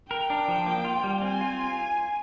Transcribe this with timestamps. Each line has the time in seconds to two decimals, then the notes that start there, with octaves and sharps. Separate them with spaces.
0.11 A#4 G5
0.30 D4
0.48 F3
0.66 A#3
0.85 F4
1.03 G3
1.22 C4 G#5
1.41 F4